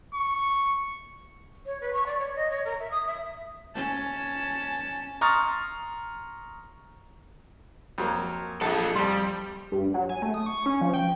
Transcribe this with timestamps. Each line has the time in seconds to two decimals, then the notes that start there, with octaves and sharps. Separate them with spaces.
0.14 C#6
1.65 C#5
1.81 B4
1.93 C#6
2.06 D5
2.18 C#5
2.36 D#5
2.50 C#5
2.65 A#4
2.79 E5
2.91 D#6
3.06 E5
3.75 C#4 A5
5.21 A#5 C6 C#6 D#6 F6 A6
7.98 F2 F#3 A#3
8.61 A#1 F4 A4
8.95 F2 G3 C6
9.72 G2
9.94 F#3
10.09 G#5
10.22 A3
10.34 D#6
10.46 C#6
10.66 C#4
10.81 F3
10.94 G5